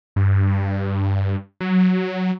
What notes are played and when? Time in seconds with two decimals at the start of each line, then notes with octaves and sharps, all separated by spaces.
0.16 G2
1.60 F#3